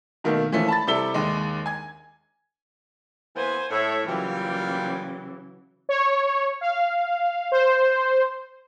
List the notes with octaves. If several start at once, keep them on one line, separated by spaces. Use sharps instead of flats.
B2 D#3 A3 A#3
E3 F3 A3 C#4
A5 B5 A6
C3 G3 E4 A4 E5 G7
D#2 G#3
G#5 G#6
E3 A#3 B3 C5 G#5
A2 C#5 E5
C#3 E3 F#3 G3 A#3 F4
C#5
F5
C5